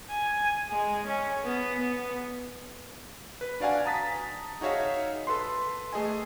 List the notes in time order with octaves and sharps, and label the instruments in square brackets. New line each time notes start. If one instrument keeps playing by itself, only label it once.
[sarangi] G#5
G#3
C#4
B3
B3
[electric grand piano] B4
D4 F#4 D5 F5 F#5 G#5
A5 A#5 D#6 A6 B6
D#4 F#4 G#4 C#5 E5 F5
A4 B4 C6
A3 G#4 D#5 G#5